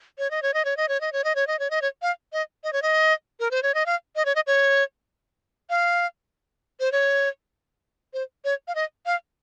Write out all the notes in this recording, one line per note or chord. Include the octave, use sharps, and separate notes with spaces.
C#5
D#5
C#5
D#5
C#5
D#5
C#5
D#5
C#5
D#5
C#5
D#5
C#5
D#5
C#5
F5
D#5
D#5
C#5
D#5
A#4
C5
C#5
D#5
F5
D#5
C#5
D#5
C#5
F5
C5
C#5
C5
C#5
F5
D#5
F5